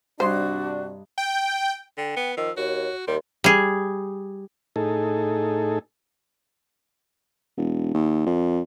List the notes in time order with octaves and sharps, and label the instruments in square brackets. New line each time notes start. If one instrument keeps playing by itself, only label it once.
[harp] G2 D#4 C6 [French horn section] C3 D4 [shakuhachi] F#4 [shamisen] C5
[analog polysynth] G5
[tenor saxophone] D3 [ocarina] G5
[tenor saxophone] B3
[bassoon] D#3 [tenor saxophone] F3 [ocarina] E6
[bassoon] D#2 [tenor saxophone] F#4 [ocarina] C#5
[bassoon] D#2 [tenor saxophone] G3 [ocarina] C6
[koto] G3 G#4
[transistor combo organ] A2 D#4 G#4 A4
[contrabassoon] E1
D#2
F2